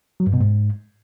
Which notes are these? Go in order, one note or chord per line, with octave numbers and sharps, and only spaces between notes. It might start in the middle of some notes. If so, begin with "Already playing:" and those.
F#3
G2
B2
G#2